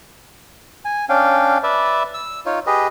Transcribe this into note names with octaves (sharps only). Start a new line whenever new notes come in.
G#5
C#4 D4 F5 G5
B4 D5 E5
E6
D#4 F4 C#5
G4 G#4 B4 D#5